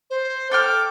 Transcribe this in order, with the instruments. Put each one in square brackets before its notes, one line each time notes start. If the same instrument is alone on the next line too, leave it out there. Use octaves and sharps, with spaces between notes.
[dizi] C5
[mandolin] A4 G5 F6 [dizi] D6